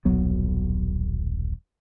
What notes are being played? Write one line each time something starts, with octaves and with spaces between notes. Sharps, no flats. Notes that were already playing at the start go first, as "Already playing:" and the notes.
D#1 B1 F#3 B3